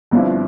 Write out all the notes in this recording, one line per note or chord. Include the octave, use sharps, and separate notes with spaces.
G1 G2 F3 C4 E4